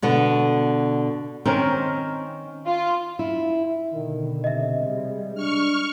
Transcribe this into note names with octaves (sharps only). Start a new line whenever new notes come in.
B2 D3 B3
D#3 C4 C#4 A#4
F4
E4
B2 D3 D#3
C3 D#5 E5
G3 G#3
D4 C#6 F6